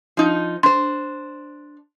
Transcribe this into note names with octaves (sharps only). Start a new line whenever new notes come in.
F3 D#4
D4 C5 C6